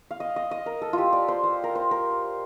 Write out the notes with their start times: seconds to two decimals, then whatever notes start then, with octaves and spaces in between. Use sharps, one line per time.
0.11 F5
0.20 D#5
0.36 D#5
0.51 D#5
0.66 A#4
0.82 A4
0.93 F4
0.98 G4
1.13 D5
1.28 C5
1.44 C5
1.64 A#4
1.75 C5
1.91 A#4